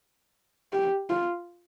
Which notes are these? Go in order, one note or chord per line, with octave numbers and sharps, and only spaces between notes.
G4
F4